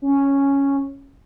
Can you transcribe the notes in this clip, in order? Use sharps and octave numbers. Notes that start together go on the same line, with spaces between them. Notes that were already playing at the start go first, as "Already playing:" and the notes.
C#4